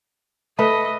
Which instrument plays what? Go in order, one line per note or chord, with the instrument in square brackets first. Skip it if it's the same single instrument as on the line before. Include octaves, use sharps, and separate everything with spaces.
[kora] A3 B4 [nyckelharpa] A4 D#5